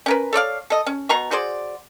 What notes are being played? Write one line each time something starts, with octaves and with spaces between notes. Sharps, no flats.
C#4 A#4 B4
A4 C#5 D5 F5
A4 D#5
C#4
B2 A#5 C#6
F#4 G#4 C5 D5